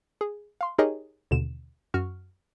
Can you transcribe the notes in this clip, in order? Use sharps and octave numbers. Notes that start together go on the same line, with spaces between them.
G#4
F5 C6
D#4 G4 G#4 A#4 C#5 D#5
D#2 B2 D3 E7
F#2 F#4 C#6 F6